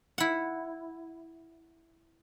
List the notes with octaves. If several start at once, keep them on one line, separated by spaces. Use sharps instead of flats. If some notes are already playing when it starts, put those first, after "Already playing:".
E4 F#5